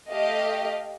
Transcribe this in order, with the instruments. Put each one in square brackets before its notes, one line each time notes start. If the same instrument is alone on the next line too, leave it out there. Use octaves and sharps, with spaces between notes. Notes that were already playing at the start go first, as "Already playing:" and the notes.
[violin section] A3 G4 D#5 F5